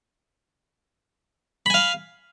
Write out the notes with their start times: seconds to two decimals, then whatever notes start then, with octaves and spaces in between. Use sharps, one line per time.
1.66 B5
1.70 G#5
1.74 F5